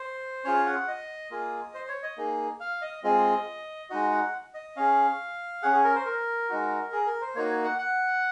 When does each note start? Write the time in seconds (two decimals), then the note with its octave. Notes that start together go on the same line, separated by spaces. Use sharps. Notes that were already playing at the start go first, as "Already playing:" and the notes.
Already playing: C5
0.44 C#4 F4 G#4 C#5
0.66 F#5
0.87 D#5
1.31 A#3 F4 G#4
1.74 C5
1.88 C#5
2.03 D#5
2.17 A#3 D#4 G#4
2.60 F5
2.82 D#5
3.03 G#3 C4 F4 G#4 D#5
3.89 G#3 D#4 F#4 D#5
4.12 F#5
4.54 D#5
4.76 C#4 G#4 F5
5.62 C#4 G#4 F#5
5.73 G#4
5.84 A#4
5.95 C5
6.06 A#4
6.49 G#3 D#4 F#4
6.92 G#4
7.06 A#4
7.21 C5
7.35 A#3 D#4 F#4 C#5
7.64 F#5
7.78 F#5